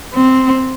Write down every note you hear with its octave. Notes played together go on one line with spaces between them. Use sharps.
C4